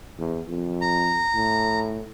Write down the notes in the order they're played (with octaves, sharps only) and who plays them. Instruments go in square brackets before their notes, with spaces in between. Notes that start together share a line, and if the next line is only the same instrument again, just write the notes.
[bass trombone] E2
F2
[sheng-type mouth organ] A#5
[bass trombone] A2